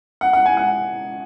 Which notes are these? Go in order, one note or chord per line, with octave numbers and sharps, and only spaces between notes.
F#5
F#5
G#5
F#5